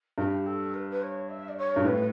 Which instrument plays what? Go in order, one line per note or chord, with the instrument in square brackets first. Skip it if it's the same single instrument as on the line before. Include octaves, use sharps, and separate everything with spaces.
[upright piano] G2 [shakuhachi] A4
[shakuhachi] G4
A4
B4
B4
C#5
E5
D5
C#5
[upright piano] G2
[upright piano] A2 [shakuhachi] B4